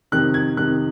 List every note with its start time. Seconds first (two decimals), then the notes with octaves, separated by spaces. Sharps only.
0.12 F2 C3 D#3 F#6
0.34 G#6
0.57 F2 C3 D#3 F#6